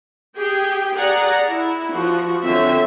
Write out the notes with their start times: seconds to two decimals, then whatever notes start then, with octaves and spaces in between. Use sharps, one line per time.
0.37 G4 G#4 G5
0.95 G#4 D5 F#5 A#5
1.48 E4
1.91 F3 F#4
2.44 D3 F#3 C4 E5